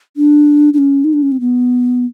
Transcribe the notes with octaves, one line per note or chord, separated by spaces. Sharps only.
D4
D4
C#4
D#4
D4
C#4
C4
B3